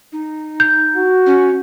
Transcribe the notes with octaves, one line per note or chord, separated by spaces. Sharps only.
D#4
G6
F#4
C#4